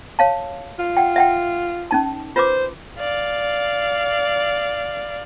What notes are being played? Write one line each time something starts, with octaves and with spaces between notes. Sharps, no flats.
C#5 F5 A5
F4
F#5 G5
E5 F#5 G5
C#4 D#4 A5
F4 B4 C5 D6
D5 F5